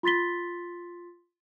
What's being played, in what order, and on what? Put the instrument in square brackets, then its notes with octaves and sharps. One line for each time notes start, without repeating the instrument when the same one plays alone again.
[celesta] F4 C6 A6 B6 G7